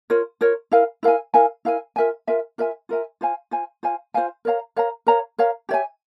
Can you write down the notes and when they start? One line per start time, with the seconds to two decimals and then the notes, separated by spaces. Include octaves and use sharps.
0.10 F4 A#4 C#5
0.41 F4 A#4 C#5
0.71 E4 A#4 F5 G#5
1.03 E4 A#4 F5 G#5
1.34 E4 A#4 F5 G#5
1.65 E4 A#4 F5 G#5
1.96 F4 A#4 E5 G#5
2.27 F4 A#4 E5 G#5
2.58 F4 A#4 E5 G#5
2.89 F4 A#4 E5 G#5
3.21 F4 C5 F5 G#5
3.51 F4 C5 F5 G#5
3.83 F4 C5 F5 G#5
4.14 F4 C5 F5 G#5
4.45 A#4 C#5 F5 A#5
4.76 A#4 C#5 F5 A#5
5.07 A#4 C#5 F5 A#5
5.38 A#4 C#5 F5 A#5
5.69 G4 C#5 E5 G#5